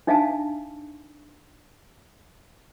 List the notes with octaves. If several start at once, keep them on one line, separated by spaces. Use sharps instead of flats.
D4 D#4 E5 F5 G#5 A5